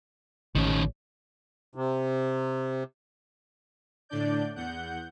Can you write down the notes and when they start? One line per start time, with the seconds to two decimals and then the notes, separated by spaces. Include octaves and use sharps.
0.55 A1 D#3 C#4
1.75 C3
4.09 A2 D3 D4 D5 G6
4.56 E2 F#5 G6